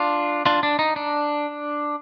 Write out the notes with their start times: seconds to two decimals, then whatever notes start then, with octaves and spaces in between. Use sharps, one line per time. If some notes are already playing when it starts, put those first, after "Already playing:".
Already playing: D4 F4
0.46 D4 F4
0.63 D4
0.79 D#4
0.96 D4